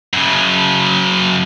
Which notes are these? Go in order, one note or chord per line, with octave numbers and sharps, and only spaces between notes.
F#2 C#3